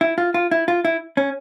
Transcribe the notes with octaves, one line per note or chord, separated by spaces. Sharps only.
E4
F4
F4
E4
F4
E4
C#4